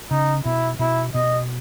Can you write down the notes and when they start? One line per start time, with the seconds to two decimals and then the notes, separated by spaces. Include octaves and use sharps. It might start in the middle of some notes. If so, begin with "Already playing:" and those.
0.11 C#3 D#4
0.45 B2 E4
0.79 B2 E4
1.14 B2 D#5